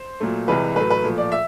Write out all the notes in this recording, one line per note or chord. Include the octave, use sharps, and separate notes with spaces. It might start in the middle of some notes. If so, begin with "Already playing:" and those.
Already playing: C5
A#2 F#3 A3
C2 C3 E3 G#3 B4
A2 F#3 A3 B4
B4
A#2 F3 A3
D5
E5